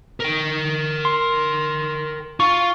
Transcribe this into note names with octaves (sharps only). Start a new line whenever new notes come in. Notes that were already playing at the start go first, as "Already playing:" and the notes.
A#4 G5
C6
F4 C#6